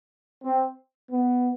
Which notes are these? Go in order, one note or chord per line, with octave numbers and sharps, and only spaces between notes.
C4
B3